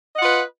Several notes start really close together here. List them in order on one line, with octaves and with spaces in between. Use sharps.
D#5 F#5 F4 B4